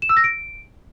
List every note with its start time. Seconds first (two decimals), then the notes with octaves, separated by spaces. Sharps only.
0.02 E7
0.09 E6
0.17 A#6
0.24 D7